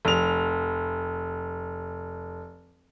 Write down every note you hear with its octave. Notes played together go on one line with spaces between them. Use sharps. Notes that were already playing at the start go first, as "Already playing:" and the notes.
F1 F7